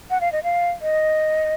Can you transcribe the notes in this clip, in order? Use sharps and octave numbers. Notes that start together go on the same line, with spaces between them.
F#5
F5
D#5
F5
D#5